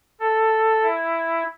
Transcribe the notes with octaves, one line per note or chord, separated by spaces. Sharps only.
A4
E4